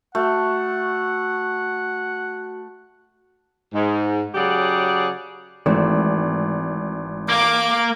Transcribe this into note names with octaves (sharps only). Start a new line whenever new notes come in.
A3 F#4 F#5
G#2
C#3 F#3 G4 G#4 D5 F#5
G#1 E3 A3 C4
A#3 D6